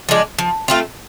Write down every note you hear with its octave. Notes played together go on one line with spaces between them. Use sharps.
F3 G#3 D4
F3
A3 C4 F4